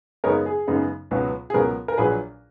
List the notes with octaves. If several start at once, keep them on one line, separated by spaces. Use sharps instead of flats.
F#2 C#3 G#3 B3 D#4 A#4 C#5
G#4
F#2 C#3 G#3 B3 D#4
C#2 B2 F#3 B3
G#4
C#2 B2 F#3 B3 A#4
A#4
A#1 A#2 F#3 G#4 B4